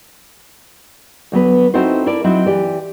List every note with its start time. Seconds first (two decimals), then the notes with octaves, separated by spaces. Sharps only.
1.32 D2 F#3 B3 B4
1.74 C4 D#4 E4 F#4 A4 C5
2.06 E4 A4 A#4 D5
2.24 F#3 C4 D#4 E4
2.46 E3 G4 D5